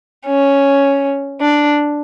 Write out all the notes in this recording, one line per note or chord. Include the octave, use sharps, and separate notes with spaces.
C#4
D4